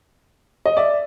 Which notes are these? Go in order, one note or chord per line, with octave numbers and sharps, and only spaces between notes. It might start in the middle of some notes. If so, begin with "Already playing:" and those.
D#5
D5 E5